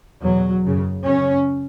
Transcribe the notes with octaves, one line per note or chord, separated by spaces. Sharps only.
E2 B2 F#3
F#2 C#3
F#2 C#3 C#4